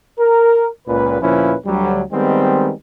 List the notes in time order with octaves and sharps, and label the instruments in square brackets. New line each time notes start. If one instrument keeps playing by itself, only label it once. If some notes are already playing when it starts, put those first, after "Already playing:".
[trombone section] A#4
C#2 A#2 B4
D2 A#2 F3 C#4 E4 B4
D2 F#3 G3
D#3 G3 G#3 B3 C4